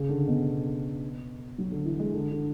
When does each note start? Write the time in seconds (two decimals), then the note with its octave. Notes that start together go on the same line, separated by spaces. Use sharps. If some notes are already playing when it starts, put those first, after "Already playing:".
Already playing: C#3
0.09 D3
0.27 B2
1.58 F#3
1.71 D3
1.85 E3
1.99 G#3
2.14 D3
2.31 D3